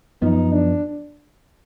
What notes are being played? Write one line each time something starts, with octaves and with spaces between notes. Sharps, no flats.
F#2 F3 B3 D#4
D4